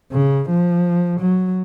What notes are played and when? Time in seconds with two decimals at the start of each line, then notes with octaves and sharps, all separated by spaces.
0.12 C#3
0.49 F3
1.20 F#3